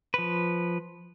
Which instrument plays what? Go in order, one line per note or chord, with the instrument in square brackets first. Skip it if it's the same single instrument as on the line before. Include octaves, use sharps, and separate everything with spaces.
[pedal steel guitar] F3 B4